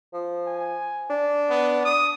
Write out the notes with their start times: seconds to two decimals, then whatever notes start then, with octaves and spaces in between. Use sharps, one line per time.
0.14 F3
0.47 G#5
1.10 D4
1.50 B3
1.86 D#6